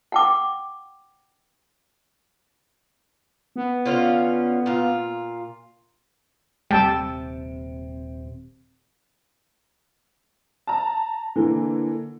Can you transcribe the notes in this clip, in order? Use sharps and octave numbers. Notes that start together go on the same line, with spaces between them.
F#5 G5 D6
B3
D3 C#4 F4
A#2 F4
D#1 C3 G3 G5 A5 E6
A5 A#5
D3 E3 A#3